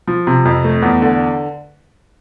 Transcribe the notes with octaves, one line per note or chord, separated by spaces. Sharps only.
F3
C3
F2
A3
E2
D3